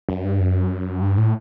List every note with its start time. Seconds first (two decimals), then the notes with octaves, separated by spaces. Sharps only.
0.09 F#2
0.24 G2
0.40 F#2
1.02 G2
1.17 A2